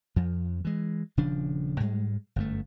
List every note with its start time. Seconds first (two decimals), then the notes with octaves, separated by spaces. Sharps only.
0.16 F2 F3
0.65 E3 G#3
1.17 D#1 C#3 F3 D4
1.80 G#2 G3 G#3
2.36 G1 F#2 A3